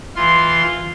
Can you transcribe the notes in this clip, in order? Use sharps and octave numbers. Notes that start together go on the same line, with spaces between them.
E3 F4 C6